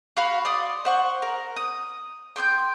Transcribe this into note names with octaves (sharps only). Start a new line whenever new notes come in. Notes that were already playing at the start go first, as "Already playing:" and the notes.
F#4 F5 B5
D5 C6 D#6
C5 F#5 C#6
A#4
D#6
G5 C6 D#6 G6